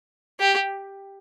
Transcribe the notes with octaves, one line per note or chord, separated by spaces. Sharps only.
G4